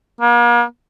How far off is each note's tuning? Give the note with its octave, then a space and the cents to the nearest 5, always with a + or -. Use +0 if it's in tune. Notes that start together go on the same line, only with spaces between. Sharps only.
A#3 +40